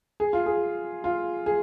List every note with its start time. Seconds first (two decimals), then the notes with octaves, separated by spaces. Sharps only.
0.20 G#4
0.33 F4
0.46 G#4
1.04 F4
1.46 G#4